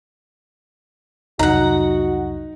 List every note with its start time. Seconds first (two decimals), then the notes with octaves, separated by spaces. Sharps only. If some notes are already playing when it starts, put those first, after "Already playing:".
1.39 C2 F2 F#3 D#4 F#4 F#5 A#5